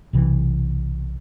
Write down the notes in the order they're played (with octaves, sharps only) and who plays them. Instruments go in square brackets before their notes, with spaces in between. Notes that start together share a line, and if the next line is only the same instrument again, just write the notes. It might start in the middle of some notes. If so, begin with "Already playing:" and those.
[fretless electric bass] B1 C3 E3